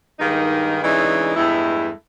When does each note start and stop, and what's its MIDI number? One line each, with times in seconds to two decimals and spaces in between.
0.20 0.78 43
0.20 0.78 51
0.20 0.78 56
0.20 0.78 58
0.20 0.78 63
0.83 1.31 49
0.83 1.31 52
0.83 1.31 56
0.83 1.31 57
0.83 1.31 62
0.83 1.31 63
1.35 1.90 40
1.35 1.90 43
1.35 1.90 56
1.35 1.90 57
1.35 1.90 64